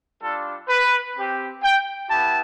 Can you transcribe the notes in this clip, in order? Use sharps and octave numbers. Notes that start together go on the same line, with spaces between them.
G3 D4 F4 A4
B4
C4 G4
G5
B3 E4 G4 A5